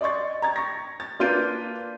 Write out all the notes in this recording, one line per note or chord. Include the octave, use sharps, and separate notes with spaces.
D5 D#5 C6 C#6 A6
A#5 G#6 A6
C#6 A#6
A6
A#3 D4 F4 B4 G6 D#7